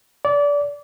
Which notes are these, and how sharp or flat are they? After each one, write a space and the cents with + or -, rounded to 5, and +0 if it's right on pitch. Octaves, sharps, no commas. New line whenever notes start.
D5 -25